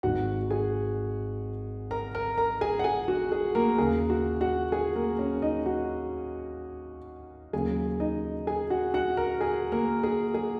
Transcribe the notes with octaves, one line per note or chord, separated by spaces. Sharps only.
G#1 G#2 D#3 G#3 F#4 F#5
G#4 G#5
A#4 A#5
A#4 A#5
A#4 A#5
G#4 G#5
F#5
G#4 G#5
F#4
G#4
A#3 A#4
D#2 C#3 A#3 G#4
F#4
F#4 F#5
G#4 G#5
A#3 A#4
C#4 C#5
D#4 D#5
F#4 F#5
D#2 C#3 F#3 A#3 G#4 G#5
D#4 D#5
G#4 G#5
F#4 F#5
F#4 F#5
A#4 A#5
G#4 G#5
A#3 A#4
G#4
G#4